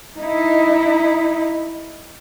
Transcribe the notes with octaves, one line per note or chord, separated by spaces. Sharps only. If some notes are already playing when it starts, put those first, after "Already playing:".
D#4 E4